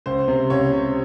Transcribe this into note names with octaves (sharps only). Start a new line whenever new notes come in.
C#2 C5
C3
C#2 C#5
C3